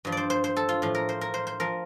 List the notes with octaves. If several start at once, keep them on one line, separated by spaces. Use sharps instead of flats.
G2 F3
C5 D5
C5
C5
A4
F4
A2 F3
A#4
C5
A#4
C5
C5
F3 A#4